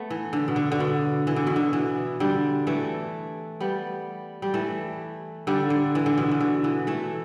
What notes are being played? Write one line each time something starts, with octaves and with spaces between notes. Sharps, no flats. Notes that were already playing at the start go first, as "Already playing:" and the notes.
Already playing: A3 B3
E3
D3
B2
D3
D3
B2
E3
D3
B2
D3
E3
D3 G3
E3 A3
G3 B3
G3
E3 A3
D3 G3
D3
E3
D3
B2
E3
D3
E3
E3 A3